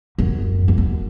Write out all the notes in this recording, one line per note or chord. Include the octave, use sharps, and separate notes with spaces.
F#2
F2
F#2